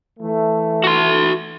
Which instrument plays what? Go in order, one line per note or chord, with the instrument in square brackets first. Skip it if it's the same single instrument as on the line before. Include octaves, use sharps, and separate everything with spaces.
[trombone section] E3 A3
[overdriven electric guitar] F#4 C6